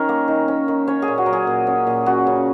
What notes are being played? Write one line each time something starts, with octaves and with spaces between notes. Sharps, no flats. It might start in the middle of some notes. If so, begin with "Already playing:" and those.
Already playing: D#3 C#4 A#4
A#3
D#3
C#4
D#3
C#4 C#5
G#4
A#2
F#4
F#3 A#4
G#4
A#2
C#4
A#2
C#4 F#4
C#3